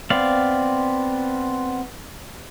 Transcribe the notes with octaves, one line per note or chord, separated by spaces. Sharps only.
B3 C4 D5 F5